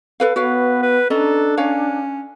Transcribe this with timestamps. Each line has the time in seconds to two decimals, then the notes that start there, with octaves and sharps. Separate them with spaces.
0.20 A4 B4 F5
0.36 B3 F#4 B4 C#5 F5
0.82 B4
1.10 C#4 D4 A4 D#5 A#5
1.57 C#4 C#5 F5